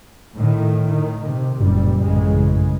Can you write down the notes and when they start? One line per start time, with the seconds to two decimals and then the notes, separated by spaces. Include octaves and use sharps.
0.36 A2 D#3
0.88 D#3
1.24 C3
1.61 F#1 F#2 A#2 G3
2.01 A1 C#3 G#3